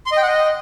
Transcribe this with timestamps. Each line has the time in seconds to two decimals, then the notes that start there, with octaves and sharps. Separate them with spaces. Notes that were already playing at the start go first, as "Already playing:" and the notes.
0.06 C6
0.12 D#5
0.17 G5
0.23 F#5
0.28 D#5